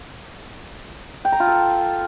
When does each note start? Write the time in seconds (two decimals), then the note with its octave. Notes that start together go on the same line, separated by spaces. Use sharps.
1.25 G5
1.32 A#5
1.40 F4
1.47 A4